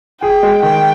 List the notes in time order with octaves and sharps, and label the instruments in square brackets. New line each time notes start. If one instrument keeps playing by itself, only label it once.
[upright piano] G#4 [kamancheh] G5
[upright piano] G#3
[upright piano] D#3 [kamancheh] G5